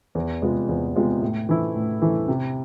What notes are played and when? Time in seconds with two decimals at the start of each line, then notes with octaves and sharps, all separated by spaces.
0.15 E2
0.42 C3 G#3 B3 F4
0.69 E2
0.96 C3 G#3 B3 F4
1.22 A2
1.49 E3 A3 E4
1.76 A2
2.02 E3 A3 E4
2.28 C3